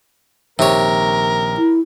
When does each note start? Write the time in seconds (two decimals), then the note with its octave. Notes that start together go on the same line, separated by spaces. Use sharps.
0.59 A#1 C3 D#3 A#4 C#5
1.57 E4